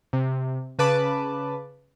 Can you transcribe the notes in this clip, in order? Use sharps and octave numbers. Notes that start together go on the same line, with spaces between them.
C3
C#3 B4 A5 D6